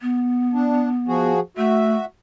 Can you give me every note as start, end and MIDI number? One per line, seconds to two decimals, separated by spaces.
0.02 1.32 59
0.53 0.89 62
1.08 1.40 53
1.08 1.40 66
1.08 1.40 68
1.57 1.96 57
1.57 2.05 66
1.57 2.05 76